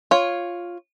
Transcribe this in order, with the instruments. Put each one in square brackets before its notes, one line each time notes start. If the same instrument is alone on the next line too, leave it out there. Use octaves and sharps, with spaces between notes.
[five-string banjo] F4 C#5